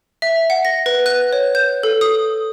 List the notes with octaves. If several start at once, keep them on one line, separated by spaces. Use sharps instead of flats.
E5
F#5
A#6
B4
F#6
C#5
G6
A4
D#6